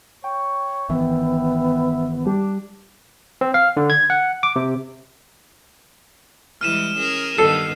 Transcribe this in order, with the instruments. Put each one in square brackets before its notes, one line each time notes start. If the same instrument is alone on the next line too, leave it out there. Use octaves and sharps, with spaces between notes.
[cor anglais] C#5 [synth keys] G5
[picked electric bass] G1 D#3 E3 [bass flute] B3 [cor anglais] E5
[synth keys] G3 G4 [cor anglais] D4
[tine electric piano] C4
F5
D3
G#6
F#5
D6
C3
[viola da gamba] E3 G3 G#3 [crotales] F6 D#7 E7
[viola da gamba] C#4 G#4 A#4
[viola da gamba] G2 D#3 B3 [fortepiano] A4 [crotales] C7